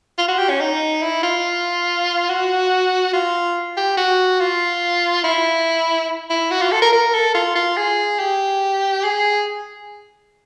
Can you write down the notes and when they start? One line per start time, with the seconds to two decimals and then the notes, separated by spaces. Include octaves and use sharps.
0.18 F4
0.28 F#4
0.39 G4
0.49 C#4
0.60 D#4
1.02 E4
1.23 F4
2.29 F#4
3.13 F4
3.77 G4
3.97 F#4
4.40 F4
5.24 E4
6.30 E4
6.51 F#4
6.61 F4
6.72 A4
6.82 A#4
6.93 A#4
7.14 A4
7.35 F4
7.55 F4
7.77 G#4
8.19 G4
9.04 G#4